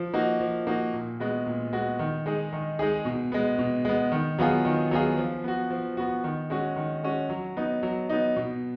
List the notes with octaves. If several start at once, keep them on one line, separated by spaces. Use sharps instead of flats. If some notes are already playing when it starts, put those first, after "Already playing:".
Already playing: F3
A#3 D#4 F#4
F3
A#3 D#4 F#4
A#2
G#3 B3 F#4
A#2
G#3 B3 F#4
D#3
G#3 D#4 G#4
D#3
G#3 D#4 G#4
B2
G#3 B3
B2
G#3 B3
D#3
F#3 B3 F4 G#4
D#3
F#3 B3 F4 G#4
F3
B3 F#4
F3
B3 F#4
D#3
G#3 C#4 F#4
D#3
G#3 C#4 F#4
F#3
B3 D#4
F#3
B3 D#4
B2